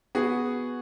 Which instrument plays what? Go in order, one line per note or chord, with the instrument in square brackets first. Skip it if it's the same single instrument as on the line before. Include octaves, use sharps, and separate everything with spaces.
[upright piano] B3 F#4 G#4